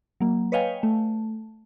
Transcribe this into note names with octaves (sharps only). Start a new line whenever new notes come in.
F#3 A#3
B4 C#5 D#5 F5 G5 G#5
A3